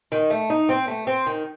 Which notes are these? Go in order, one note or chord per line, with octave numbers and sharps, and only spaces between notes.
D#3
A3
D#4
C4
A3
C4
D#3